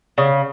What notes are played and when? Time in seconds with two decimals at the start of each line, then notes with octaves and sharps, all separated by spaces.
0.18 C#3